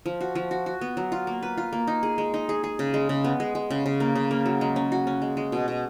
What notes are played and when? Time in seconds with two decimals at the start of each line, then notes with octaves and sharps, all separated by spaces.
0.06 F3
0.21 F#4
0.35 F3
0.51 F#4
0.66 F#4
0.81 B3
0.97 F#3
1.12 F4
1.27 A#3
1.43 B4
1.57 F4
1.73 A#3
1.87 D#4
2.03 G#4
2.18 G#3
2.34 D#4
2.49 G#4
2.64 G#4
2.79 C#3
2.94 G#3
3.09 C#3
3.24 B3
3.40 G#3
3.55 G#3
3.71 C#3
3.86 C#3
4.00 A#3
4.15 C#3
4.31 A#3
4.46 F#3
4.61 G#3
4.76 C#4
4.92 F#4
5.07 C#4
5.22 G#3
5.37 G#3
5.52 B2
5.68 B2